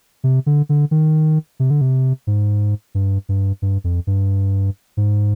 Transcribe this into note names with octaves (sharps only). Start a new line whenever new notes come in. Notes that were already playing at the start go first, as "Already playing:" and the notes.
C3
D3
D3
D#3
C3
D3
C3
G#2
G2
G2
G2
F2
G2
G#2